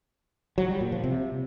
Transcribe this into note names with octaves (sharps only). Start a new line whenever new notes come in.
F#3
G3
A#2
F3
C3